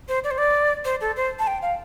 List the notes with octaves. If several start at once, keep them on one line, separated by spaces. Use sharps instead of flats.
C5
D5
C5
D5
C5
A4
C5
A5
G5
F5